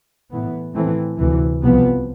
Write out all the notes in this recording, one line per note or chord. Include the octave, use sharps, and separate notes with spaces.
A2 E3 B3
A2 E3 A3 C4
D2 C3 E3
C2 C3 F3 B3